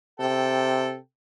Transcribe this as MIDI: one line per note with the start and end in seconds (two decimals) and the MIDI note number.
0.19 0.97 48
0.19 0.95 69
0.19 0.95 79